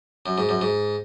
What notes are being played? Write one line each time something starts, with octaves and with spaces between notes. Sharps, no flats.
F#2
G#2
F#2
G#2